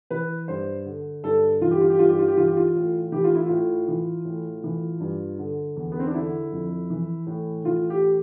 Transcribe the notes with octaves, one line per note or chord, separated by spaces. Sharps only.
E3 B4
G2 C5
D3
G2 A4
E3 F4
G4
F4
G4
G2 F4
G4
F4
G4
E3 F4
G4
F4
A2
E3 G4
F4
E4
A2 F4
E3
A2
E3
G2
D3
E2
B3
C4
D4
D3 E4
F2
E3
A2
E3 F4
G4